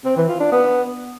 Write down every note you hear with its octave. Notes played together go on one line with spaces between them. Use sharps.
C4
E3
F4
D4
B3